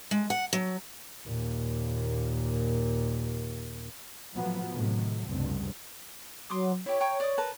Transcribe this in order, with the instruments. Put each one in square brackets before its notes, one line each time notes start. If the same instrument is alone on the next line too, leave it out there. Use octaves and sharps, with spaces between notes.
[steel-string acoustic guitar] G#3
F#5
F#3
[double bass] D#2 A#2
[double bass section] A2 F3 F#3 B3
A2 C3 D#3 F#3
F1 C#2 G2 C4
[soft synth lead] F#3 [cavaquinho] C6 D6 D#6
[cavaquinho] E4 G4 [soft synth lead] C#5
[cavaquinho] G5 A#5 C#6
D5 D#6
A#4 B4 A5